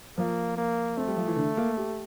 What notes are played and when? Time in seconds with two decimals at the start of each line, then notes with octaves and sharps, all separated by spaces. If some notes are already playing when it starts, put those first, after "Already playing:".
0.18 F3 A#3
0.57 A#3
0.97 A3 C4
1.07 G3
1.17 F3
1.27 E3
1.36 D3
1.57 A#3
1.77 G4